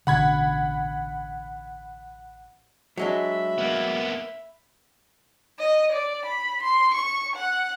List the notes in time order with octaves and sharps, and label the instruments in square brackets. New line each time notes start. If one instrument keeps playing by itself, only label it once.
[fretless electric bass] A1 B2 D3 [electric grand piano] F#5 B5 G#6
[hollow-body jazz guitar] F#3 G#3 D4 [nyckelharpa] E5 B5
[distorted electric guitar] A#3 B3
[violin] D#5
D5
B5
C6
C#6
F#5